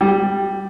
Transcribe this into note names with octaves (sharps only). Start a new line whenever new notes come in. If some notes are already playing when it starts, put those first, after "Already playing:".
G3